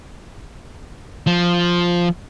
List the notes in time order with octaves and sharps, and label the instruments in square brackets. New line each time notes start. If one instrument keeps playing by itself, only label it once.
[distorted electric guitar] F3